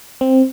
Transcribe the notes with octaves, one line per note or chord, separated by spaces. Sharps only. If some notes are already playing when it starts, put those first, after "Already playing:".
C4